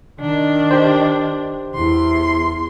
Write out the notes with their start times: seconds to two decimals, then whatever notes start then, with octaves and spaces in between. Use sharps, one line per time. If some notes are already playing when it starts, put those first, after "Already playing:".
0.20 D#3 D4
0.71 G4 C5
1.75 E2 E4 C6